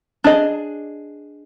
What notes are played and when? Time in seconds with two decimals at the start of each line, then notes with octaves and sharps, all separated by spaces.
0.24 D4 G#4 D#5